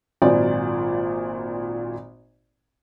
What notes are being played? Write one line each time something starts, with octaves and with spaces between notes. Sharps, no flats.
G#1 A#2 F#3 D5 G#5